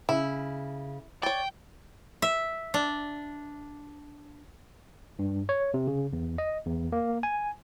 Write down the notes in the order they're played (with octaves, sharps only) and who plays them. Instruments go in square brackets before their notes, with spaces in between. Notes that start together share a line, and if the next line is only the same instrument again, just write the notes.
[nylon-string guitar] C#3 [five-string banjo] E4
[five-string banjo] C#5 D5 [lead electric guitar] G5
[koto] E5
D4
[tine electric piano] G2
C#5
C3
C#3
E2
D#5
E2
A#3
G#5